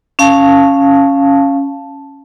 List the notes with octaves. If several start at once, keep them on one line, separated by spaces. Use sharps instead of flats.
C#4 F5 A5